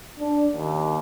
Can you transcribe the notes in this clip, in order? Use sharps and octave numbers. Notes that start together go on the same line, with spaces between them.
D4
D#2